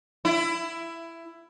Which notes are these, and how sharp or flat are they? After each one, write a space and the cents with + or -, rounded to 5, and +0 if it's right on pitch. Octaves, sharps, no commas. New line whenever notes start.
E4 +15